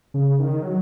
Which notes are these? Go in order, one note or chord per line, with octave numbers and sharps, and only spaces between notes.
C#3
D#3
F#3